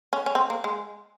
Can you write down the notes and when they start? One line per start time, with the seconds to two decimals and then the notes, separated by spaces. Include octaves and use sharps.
0.13 C#4
0.26 C#4
0.35 C4
0.50 A#3
0.64 G#3